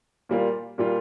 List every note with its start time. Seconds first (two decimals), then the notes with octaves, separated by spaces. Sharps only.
0.29 A#2 G3 A#3 F4
0.78 A#2 G3 A#3 F4